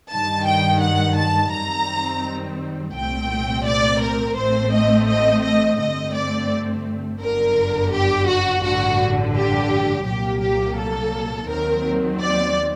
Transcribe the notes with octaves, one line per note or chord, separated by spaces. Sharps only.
G2 D#3 G3 A5
G5
F#5
A5
F#2 D#3 G3 C4 A#5
C2 A#2 A3 C4 G5
D5
A#4
A1 A2 A3 C4 C5
D#5
D#5
D#5
G2 D3 A3 C4 D#5
D5
G1 F#2 D3 A#4
G4
F#4
A1 G2 D3 F#4
G4
C2 A#2 F#3 A#3 G4
G4
A4
D#2 D#3 F#3 C4 A#4
D5